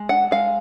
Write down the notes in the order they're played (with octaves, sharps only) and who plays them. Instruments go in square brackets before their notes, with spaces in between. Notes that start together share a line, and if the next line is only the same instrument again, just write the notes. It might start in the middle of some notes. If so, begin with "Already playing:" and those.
Already playing: [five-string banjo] G#3
D4 F#5
G#3 F5